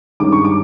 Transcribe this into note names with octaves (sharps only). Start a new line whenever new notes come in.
G2 D#3 G#3 C#4 D6
C#6
D6